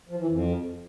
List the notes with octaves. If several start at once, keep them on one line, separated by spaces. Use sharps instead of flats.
F3
E3
F2